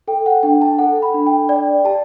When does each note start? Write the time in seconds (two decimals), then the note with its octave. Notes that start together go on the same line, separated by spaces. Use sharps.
0.08 A4 G5
0.26 F#5
0.43 D4 G5
0.62 A5
0.79 A4 F#5
1.02 B5
1.14 D4
1.26 G5
1.49 D5 G5
1.85 G4 A5